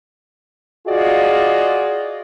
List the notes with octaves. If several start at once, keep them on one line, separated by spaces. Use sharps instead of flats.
F4 F#4 G#4 D5 D#5